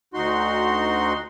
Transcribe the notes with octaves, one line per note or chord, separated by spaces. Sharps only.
D2 D#4 F#4 C6